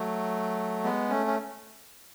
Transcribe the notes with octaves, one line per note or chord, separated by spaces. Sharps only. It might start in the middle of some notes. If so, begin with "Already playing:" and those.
Already playing: F#3 A3
G#3 B3
A3 C#4
C#4